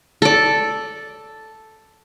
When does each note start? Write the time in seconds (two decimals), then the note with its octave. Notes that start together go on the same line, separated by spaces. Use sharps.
0.22 A4 D5